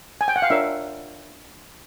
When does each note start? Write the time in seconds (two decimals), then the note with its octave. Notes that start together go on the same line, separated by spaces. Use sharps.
0.21 G#5
0.28 G5
0.36 F#5
0.42 F5
0.50 D4 F4 A#4 C#5 E5